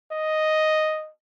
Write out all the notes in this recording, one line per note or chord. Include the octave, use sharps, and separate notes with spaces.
D#5